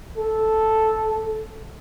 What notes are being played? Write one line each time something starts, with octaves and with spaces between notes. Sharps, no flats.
A4